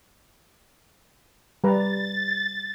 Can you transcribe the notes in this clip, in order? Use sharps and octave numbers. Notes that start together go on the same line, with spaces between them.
G3 B4 A#5 A6